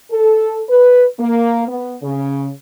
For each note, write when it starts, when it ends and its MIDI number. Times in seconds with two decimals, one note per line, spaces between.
0.11 0.60 69
0.68 1.05 71
1.18 1.63 58
1.67 1.93 59
2.02 2.49 49